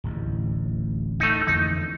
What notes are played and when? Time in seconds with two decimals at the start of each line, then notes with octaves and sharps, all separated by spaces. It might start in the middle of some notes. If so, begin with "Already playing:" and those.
0.04 D1 A1 D#2
1.20 A3 D#4
1.47 F2 D3 E3 D#4